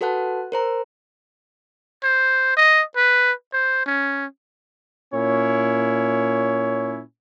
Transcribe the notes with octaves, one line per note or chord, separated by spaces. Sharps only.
F#4 A4 B4 F#5 A5 F#6
A#4 C5 A#5
C5
D#5
B4
C5
C#4
A#2 C#4 E4 C#5